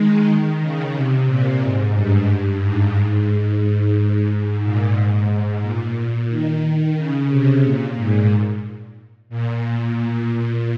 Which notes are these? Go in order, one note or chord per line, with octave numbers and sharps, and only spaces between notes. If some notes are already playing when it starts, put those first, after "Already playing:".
Already playing: D#3 G#3
C#3
C3
A#2
G#2
G2
G#2
G#2
G#2
G#2
G#2
A#2
G#2
A#2
D#3
C#3
C3
A#2
G#2
A#2